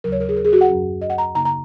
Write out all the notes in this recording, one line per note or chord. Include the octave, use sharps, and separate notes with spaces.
D#2 C#3 F#3 A#4
C#5
A#4
G#4
A#4
G#4
F#4
F#5
F#2 F#3 C#4
D#5
F#5
A#5
C#3 A#3 D#4 A#5
A#5